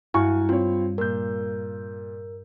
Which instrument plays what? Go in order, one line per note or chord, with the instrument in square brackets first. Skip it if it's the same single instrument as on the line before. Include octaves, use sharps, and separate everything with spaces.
[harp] G2 [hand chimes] E4 [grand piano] F#4 G#5 C#6
[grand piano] C4 C#5 [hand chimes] F4
[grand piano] A#2 G6 [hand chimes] A#4